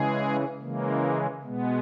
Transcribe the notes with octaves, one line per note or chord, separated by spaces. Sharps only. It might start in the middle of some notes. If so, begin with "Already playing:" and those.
Already playing: C#3 E3 G#3 G#4
C#3 E3 G#3 A#3
B2 G#3 B3